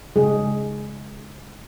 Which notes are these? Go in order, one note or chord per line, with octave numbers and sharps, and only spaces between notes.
C#3 G#3 G#4